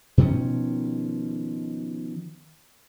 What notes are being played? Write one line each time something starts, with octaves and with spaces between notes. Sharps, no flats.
B2 D#3 F3 C#4